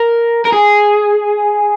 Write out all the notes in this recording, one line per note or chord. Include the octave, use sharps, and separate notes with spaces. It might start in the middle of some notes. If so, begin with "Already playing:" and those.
Already playing: A#4
A#4
G#4